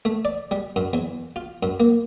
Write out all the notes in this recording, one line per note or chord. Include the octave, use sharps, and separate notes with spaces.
A3
D5
G3
F#2
E2
F4
F#2
A#3